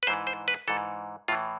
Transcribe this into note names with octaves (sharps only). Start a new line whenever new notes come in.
B4
G#2 E3 C5
C5
B4
G#2 E3 A4
A2 E3 F4